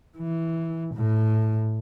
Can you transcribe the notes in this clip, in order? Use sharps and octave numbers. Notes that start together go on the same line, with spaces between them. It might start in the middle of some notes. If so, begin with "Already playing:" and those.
E3
A2